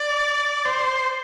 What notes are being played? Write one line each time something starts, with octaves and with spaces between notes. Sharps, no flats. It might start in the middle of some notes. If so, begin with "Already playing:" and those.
Already playing: D5
C5